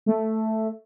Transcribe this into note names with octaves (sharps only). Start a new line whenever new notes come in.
A3